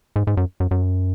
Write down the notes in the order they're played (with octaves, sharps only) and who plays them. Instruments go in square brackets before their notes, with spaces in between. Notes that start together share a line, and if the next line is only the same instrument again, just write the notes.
[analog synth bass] G#2
G#2
F#2
F#2
F#2